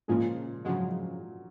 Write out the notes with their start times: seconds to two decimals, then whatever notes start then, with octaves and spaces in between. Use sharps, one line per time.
0.08 A#2 C#3 F3 G#3
0.65 C#3 F3 F#3 G#3